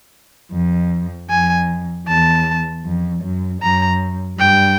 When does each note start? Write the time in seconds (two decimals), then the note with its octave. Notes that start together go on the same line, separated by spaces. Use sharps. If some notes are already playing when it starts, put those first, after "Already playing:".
0.52 F2
1.30 F2 G#5
2.07 E2 A5
2.85 F2
3.23 F#2
3.62 F#2 A#5
4.39 G2 G5